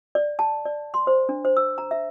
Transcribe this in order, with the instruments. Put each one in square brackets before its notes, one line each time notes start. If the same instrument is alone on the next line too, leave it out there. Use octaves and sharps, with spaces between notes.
[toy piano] D5
A5
D5
C6
C5
D4
C5
E6
A#5
E5